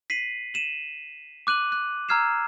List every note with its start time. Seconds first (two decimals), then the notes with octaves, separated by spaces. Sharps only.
0.10 B6 C7 D#7 F#7
0.54 D#7 E7 F#7
1.47 D6 F#6 D#7 F#7
1.72 F#6
2.09 A#5 E6 F6 G#6 C7 E7